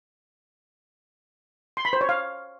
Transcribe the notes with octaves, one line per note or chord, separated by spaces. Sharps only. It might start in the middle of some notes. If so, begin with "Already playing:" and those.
C6
B5
C5
C#5
F5